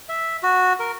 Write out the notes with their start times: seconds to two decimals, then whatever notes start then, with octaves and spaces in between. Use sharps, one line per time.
0.09 E5
0.43 F#4
0.80 A#4